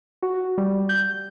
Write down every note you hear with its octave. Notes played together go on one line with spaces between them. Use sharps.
F#4
G3
G6